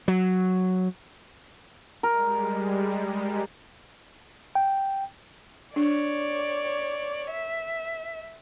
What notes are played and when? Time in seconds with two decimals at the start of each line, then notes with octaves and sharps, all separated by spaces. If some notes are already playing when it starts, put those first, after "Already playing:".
0.08 F#3
2.03 G3 G#3 A#4
4.55 G5
5.76 D4 C#5 D5
7.31 E5